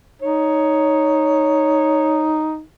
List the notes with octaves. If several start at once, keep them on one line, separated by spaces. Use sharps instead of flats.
D#4 C#5